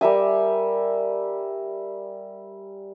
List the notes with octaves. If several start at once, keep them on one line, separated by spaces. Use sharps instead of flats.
G3 A#4 E5 G#5